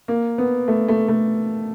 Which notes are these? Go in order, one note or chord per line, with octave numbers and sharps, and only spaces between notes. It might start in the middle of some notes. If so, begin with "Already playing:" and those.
A#3
B3
A3
A3
A3